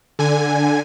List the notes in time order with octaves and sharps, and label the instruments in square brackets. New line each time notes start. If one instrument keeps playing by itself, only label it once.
[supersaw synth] D3 G#5